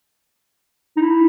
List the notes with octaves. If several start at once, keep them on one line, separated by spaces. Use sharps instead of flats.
D#4
E4